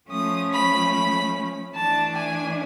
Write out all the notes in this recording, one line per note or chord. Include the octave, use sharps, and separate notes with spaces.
F3 A3 C#4 D#6
B5
B5
E3 A3 D4 A5
G#5